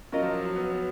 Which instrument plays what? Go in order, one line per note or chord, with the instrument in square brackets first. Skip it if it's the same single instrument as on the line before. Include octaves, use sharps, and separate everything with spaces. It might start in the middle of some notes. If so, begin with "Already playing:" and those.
[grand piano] F#3 [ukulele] C#4 F4 A#4 D#5
[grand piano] F3
F#3
F#3
B3
B3